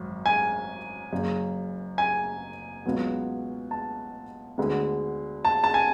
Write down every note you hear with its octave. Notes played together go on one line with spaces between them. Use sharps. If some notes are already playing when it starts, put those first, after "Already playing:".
Already playing: G#1 F#2
G#5
F#1 F#2 C#3
G#5
C#2 B2 F#3 B3
A5
D2 D3 G#3 B3
A5
A5
G#5